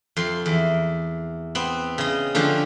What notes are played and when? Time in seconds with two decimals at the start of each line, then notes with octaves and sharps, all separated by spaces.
0.16 F2 C6
0.46 E2
1.55 B3 C4
1.98 C#3 D#5
2.35 D3 F3 C#4 G4 C5